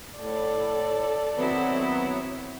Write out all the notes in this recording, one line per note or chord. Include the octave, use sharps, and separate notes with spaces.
A2 A4 D5
D#3 F#3 B3 C4 E4